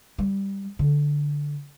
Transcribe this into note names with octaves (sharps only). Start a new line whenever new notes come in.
G3
D3